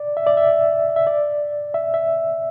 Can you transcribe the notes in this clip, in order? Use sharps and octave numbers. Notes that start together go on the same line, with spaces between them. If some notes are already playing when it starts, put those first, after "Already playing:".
Already playing: D5
E5
D5
E5
E5
D5
E5
E5